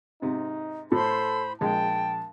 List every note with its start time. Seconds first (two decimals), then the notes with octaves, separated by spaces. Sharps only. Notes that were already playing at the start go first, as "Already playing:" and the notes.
0.22 G#2 C3 D#4
0.92 A2 A4 C5 B5 C6
1.61 A#1 G#3 G5 A5